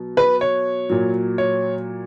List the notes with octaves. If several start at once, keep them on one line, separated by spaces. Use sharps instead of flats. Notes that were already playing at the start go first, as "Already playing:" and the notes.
Already playing: B2 F#3
B4
C#5
A#2 F#3
C#5